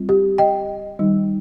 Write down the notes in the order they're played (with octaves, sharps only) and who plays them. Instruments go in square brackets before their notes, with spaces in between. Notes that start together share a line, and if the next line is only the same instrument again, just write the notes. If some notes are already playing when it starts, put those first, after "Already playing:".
Already playing: [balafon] G3 C4 F4
G4
D#5 G5
D#3 G3 D#4